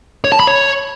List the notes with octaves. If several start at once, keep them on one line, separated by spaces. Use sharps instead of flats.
C#5
A5
B5
C#5